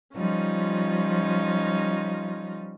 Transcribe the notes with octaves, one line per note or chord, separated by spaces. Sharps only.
F3 G3 C#4 D#4 F4